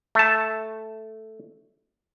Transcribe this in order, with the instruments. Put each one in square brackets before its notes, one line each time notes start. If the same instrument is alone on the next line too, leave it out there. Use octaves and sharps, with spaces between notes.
[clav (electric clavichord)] A3 A5